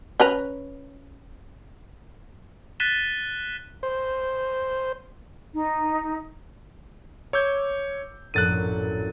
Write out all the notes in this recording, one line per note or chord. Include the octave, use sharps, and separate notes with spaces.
C#4 B4 A#5
F#6 A6 B6 D#7 E7 G7
C5
D#4
C#5 D6 E6 G6 G#6
A#1 F#2 A2 F#6 A6 D#7